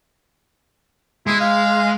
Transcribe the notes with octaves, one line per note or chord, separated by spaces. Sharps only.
G#3 E4
F5